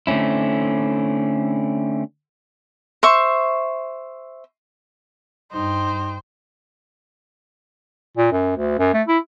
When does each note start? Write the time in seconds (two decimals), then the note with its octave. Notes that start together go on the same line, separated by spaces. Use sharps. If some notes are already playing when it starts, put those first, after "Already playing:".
0.07 D3 A3 C4 C#4 E4
3.03 C5 E5 C#6
5.52 G2 D#4 C5 G5
8.17 A#2
8.32 F#2
8.57 D2
8.79 F#2
8.94 A3
9.08 E4